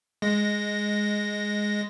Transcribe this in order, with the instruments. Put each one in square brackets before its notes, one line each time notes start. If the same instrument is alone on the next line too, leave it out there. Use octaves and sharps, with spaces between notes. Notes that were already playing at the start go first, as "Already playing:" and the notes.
[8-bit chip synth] G#3 A#6